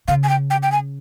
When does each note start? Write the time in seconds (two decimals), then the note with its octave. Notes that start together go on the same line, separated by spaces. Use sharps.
0.08 C#3 F5
0.23 G#5
0.29 G5
0.50 G5
0.63 G5
0.72 G#5